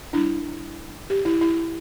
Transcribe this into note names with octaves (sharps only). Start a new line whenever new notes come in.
G3 D4 E4
G4
E4
E4